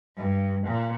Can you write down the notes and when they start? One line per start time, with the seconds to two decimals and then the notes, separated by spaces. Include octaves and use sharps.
0.16 G2
0.66 A#2